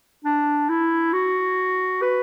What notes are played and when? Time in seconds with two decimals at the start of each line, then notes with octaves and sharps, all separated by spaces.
0.25 D4
0.69 E4
1.13 F#4
2.02 B4